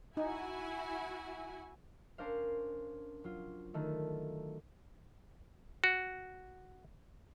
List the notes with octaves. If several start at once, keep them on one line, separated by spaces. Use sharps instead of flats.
D#4 E4 F#4 G#5
C#4 D4 A#4 C5 F5
F#3 F4
D3 D#3 A3
F#4